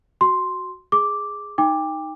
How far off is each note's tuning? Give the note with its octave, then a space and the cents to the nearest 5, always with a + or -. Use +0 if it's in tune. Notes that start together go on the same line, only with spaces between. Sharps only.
F#4 +0 C6 +0
G#4 +0 D6 -5
D#4 +0 G5 +30 D6 +0